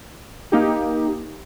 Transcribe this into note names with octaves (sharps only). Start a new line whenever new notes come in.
A#3 D#4 G4